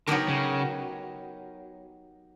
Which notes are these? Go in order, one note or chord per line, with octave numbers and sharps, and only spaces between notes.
D3 F#3 B3 D#4 G4 A#4
C#3